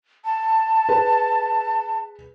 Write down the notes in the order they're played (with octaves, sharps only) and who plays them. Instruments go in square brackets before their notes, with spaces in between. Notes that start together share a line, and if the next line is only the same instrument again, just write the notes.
[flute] A5
[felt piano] G#4 B4